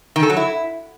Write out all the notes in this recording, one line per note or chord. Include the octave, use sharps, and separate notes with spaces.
D#3
A4
F#3
E4